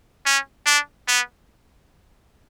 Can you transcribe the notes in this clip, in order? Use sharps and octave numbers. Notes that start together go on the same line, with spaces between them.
C#4
D4
B3